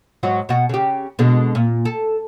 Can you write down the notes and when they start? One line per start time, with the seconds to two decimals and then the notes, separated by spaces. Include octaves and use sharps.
0.23 G#2 F#3 F#4
0.49 B2 F#4
0.69 C#3 G4
1.19 B2 D3 G#3
1.55 A#2
1.85 A4